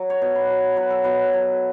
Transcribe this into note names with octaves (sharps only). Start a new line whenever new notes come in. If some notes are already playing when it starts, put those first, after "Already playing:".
Already playing: F#3
C#5
B2
B4
F#3
F#3 B4
A4
B2 B4
F#3